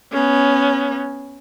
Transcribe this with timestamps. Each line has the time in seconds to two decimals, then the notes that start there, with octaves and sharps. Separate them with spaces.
0.12 B3 C#4